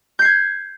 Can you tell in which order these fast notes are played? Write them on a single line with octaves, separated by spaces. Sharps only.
G6 C7 G#6